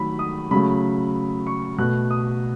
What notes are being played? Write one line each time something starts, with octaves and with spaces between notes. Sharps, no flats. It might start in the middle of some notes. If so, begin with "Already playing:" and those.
Already playing: D#3 F#3 A3 B5
D#6
C#3 F#3 A3 B5
C#6
B2 A3 F#6
D#6